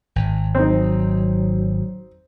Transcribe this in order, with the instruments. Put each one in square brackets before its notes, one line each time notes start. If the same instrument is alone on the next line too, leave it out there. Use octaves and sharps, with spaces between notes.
[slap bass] G#1
[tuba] F#3 [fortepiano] C4 D#4